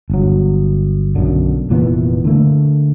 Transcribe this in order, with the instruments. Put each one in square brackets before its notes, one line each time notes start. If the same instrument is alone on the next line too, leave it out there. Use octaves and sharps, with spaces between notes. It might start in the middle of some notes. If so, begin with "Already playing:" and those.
[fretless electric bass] G1 F#3
B1 F#2 D3
F1 A#2 E3 B3
D3 A3 A#3